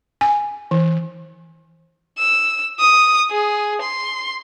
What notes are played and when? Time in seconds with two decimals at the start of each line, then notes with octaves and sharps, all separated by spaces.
0.21 G#5
0.71 E3
2.18 E6
2.80 D#6
3.31 G#4
3.81 C6